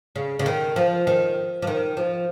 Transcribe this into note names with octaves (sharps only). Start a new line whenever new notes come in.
C#3
C#3
D#3
F3
D#3
F3
D#3
F3